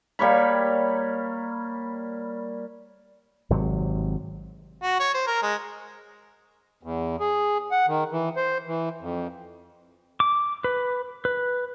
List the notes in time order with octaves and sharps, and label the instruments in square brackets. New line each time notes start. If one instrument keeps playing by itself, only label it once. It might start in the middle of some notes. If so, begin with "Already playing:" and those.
[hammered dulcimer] G3 A#3 C#5 B5
[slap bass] G#1 C3 F#3
[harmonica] F#4
C#5
C5
A#4
G#3
[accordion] E2
G#4
F#5
D#3
E3
C5
E3
F2
[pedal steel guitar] D6
B4
B4